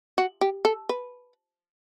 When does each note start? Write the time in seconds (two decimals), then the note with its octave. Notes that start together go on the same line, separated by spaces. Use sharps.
0.18 F#4
0.41 G4
0.65 A4
0.89 B4